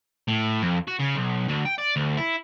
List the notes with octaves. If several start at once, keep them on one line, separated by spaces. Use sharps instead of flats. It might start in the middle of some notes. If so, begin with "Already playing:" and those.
A2
F2
F#4
C#3
B1
D2
G5
D5
D2
E4